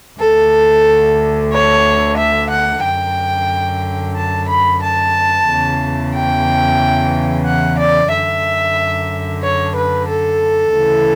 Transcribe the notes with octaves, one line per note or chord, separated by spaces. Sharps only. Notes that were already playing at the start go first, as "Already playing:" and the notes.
D2 D3 A4
C#5
E5
F#5
F#2 D3 G5
A5
B5
A5
E2 C#3 E3
G5
F#5
D5
F#2 D3 E5
C#5
B4
A4
D2 C#3 E3